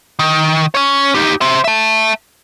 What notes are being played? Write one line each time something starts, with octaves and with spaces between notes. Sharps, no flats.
D#3
C#4 C#5
D#4 G4
C5 E5
E5 A5